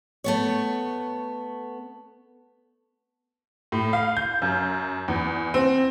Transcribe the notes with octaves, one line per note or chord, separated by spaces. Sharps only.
A3 B3 C#5
A2
F5
G6
F#2
E2
C4